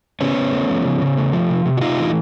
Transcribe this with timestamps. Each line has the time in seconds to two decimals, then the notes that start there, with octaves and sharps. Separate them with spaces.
0.21 C#3 B3 C#4
0.37 C#3
0.53 A3
0.69 F3
0.85 C#3
1.02 C#3
1.17 A3
1.33 F3
1.50 C3
1.66 C3
1.77 F#4
1.81 A3 D#4 F4
1.98 E3